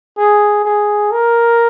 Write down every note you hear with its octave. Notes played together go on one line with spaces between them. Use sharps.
G#4
G#4
A#4